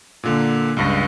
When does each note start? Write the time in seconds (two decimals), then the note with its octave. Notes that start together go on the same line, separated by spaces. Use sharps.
0.23 A#2 D3 A#3
0.77 C#2 G2 A#6